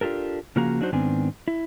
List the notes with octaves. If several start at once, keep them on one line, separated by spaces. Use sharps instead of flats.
D4 F4 G4 A4 A#4
C#3 F3 A#3 F#4 G#4 A#5
F#3 D4 D#4 F#4 C5
G#2 D#3 B3 C4 D4 G#5
E4